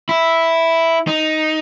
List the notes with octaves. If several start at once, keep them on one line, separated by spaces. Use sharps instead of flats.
E4
D#4